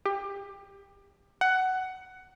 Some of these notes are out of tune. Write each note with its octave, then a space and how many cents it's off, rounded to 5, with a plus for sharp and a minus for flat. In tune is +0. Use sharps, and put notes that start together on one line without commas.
G4 +25
F#5 +15